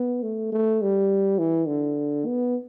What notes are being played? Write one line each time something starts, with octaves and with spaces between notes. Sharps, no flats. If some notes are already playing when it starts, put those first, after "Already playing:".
Already playing: B3
A3
A3
G3
E3
D3
B3